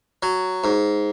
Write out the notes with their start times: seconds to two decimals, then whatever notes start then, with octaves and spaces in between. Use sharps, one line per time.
0.23 F#3
0.64 G#2